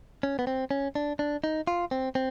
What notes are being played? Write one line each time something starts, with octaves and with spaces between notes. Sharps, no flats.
C#4
B3
C4
C#4
D4
D4
D#4
F4
C4
C4